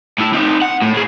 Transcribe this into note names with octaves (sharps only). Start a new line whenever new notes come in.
A2 E4
C4 D#4
F#5
A2
A2 G#4